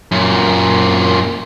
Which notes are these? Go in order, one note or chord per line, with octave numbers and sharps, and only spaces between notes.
F#2 A#2